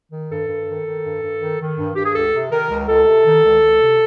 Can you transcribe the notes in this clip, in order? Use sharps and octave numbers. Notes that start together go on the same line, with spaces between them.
D#3
G2 A4
G2
D#3
D#3
G2
G2
D#3
D#3
G2
G2 G4
G#4
C#2 A4
C3
D#3 A#4
C#2
C#2 A4
C3
D#3
C#2
C#2
C3